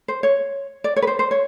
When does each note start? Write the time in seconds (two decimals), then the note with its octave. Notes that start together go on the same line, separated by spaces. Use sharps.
0.08 C5
0.23 C#5
0.84 D5
0.96 C#5
1.02 B4
1.07 C5
1.19 C5
1.31 C#5